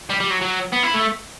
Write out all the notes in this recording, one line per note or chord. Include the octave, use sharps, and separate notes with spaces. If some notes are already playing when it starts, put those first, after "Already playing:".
G3
G3
F#3
F#3
B3
E4
A3